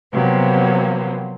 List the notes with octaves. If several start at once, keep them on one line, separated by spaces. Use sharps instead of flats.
C3 F3 F#3 A#3 B3